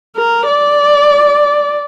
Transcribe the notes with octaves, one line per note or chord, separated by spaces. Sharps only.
A#4
D5